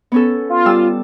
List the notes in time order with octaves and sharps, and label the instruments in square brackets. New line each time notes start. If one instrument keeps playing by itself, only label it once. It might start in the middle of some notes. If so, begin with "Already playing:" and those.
[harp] B3 C#4 A4
[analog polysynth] F4
[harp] G3 A5 E6